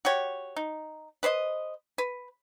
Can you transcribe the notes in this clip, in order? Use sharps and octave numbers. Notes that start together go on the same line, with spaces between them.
F#4 G4 C#5
D#4
B4 C5 D5 D#5
B4